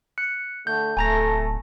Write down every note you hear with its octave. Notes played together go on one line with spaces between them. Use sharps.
F#6 C#7
D3 A3 G6
D1 A3 G#5 A#5 A#6